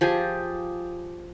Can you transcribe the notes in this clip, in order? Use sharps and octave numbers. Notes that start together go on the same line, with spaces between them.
F3 G4 G#4 G#5